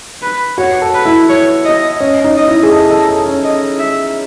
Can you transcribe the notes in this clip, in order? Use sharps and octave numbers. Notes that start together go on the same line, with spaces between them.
B4
F#4 C#5
A4
B4
E4
C#5
D#5
C#4 D#5
D#4
D#5
E4
G#4
A4 D#5
A4
A4
C#4
D#5
E5